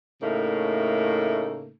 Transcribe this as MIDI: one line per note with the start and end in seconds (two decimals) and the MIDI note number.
0.22 1.72 45
0.22 1.72 49
0.22 1.72 57
0.22 1.72 58
0.22 1.72 63